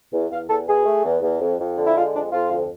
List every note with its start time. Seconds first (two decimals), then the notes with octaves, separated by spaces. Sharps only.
0.12 E2
0.30 E2 F5
0.49 E2 A4
0.67 B2 G#4
0.86 A3
1.04 E2
1.22 E2
1.41 F2
1.58 F2
1.77 D3
1.85 E4
1.95 G#3 F4
2.14 F2 D4
2.32 F2 F4
2.50 D2